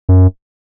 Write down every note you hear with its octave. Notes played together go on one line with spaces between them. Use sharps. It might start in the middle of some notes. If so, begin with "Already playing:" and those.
F#2